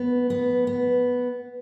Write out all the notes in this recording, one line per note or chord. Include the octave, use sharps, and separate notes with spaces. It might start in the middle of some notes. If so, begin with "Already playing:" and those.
Already playing: B3
B3
B3